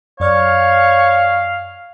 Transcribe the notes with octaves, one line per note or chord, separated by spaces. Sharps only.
F#2 C#5 D5 F5 F6